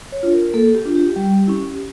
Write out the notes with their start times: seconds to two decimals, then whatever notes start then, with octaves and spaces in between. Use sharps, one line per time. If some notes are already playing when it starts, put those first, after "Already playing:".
0.12 C#5
0.23 D4 F4
0.33 A#4
0.54 A#3 A4
0.75 G4
0.85 D4 F4
0.95 G4
1.16 G3
1.47 C#4 E4